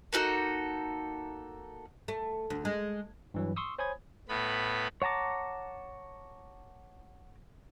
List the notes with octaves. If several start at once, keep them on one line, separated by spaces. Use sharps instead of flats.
A#3 D#4 F#4 A4
A3
D2
G#3
G2 E3 F#3
C6 C#6 D#6 E6
C5 C#5 G#5 B5 D#6 G#6
A2 B3 B5
C#5 F#5 A5 A#5 D6